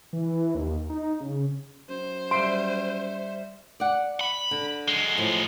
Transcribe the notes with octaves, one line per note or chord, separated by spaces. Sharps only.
E3
D#2
D#4
C#3
F#2 C5
G3 E5 C6 D7
D5 F#5
B5
D3
F#2 G#3
A2 F3